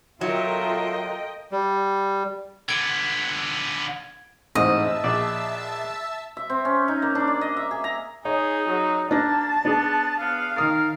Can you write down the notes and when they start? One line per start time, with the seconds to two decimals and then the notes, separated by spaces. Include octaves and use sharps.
0.21 F#3 F4 A4 A#4 D#5 E5 G5
1.52 G3
2.69 D3 B3 G#6 D7
4.55 A1 G#2 C4 D#5 E5 A5 E6
5.04 A#1 D5
6.37 E5
6.50 C4
6.65 C#4
6.88 D#4
7.02 A#3
7.15 D4
7.28 D5
7.41 D#5
7.57 E5
7.71 G#4
7.84 A#5
8.25 D#4 G#4 C#5
8.69 F#3
9.11 A#3 D4 A5 A#6
9.65 B3 D4 G#4
10.20 B3 F5
10.56 D#3 A#4 D#6 A6